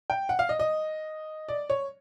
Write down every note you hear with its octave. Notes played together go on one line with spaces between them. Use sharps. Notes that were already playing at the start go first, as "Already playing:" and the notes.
G5
F#5
F5
D#5
D#5
D5
C#5